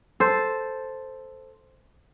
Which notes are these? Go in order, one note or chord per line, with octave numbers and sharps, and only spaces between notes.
A4 C5